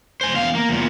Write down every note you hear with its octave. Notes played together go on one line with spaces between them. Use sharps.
C5 G#5
E2 F5
A#3
E2 A#2